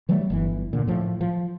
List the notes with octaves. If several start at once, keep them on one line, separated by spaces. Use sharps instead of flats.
E3 F#3 G3 A3
G1 B2 E3
A#2 D3
A2 F3
F3